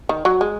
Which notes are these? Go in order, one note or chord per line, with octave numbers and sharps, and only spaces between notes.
D#3
F#3
G#3